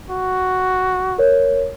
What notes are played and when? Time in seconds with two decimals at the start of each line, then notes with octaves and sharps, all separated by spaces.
0.11 F#4
1.18 A#4 C#5